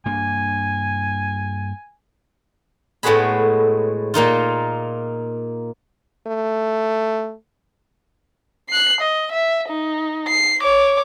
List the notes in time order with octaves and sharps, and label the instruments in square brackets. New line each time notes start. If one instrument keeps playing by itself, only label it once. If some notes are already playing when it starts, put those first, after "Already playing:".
[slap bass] G2 A#3 D4 [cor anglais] G#5
[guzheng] A2 G#3 B3 F#4 G#4 B5
A#2 A#3 D#4 F4
[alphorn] A3
[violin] F#6 C7
D#5
E5
D#4
C7
C#5 D6